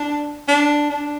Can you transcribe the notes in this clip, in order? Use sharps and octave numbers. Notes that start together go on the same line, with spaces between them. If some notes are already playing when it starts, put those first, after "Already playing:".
Already playing: D4
D4
D4